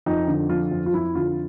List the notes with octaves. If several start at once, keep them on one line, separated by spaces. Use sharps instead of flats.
F2 D#4
D3
F3 F4
F2
F4
F2 E4
D3 F4